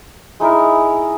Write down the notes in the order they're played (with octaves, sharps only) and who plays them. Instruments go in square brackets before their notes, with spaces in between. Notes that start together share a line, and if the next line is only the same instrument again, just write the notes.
[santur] G#3 D#4 E4 A#4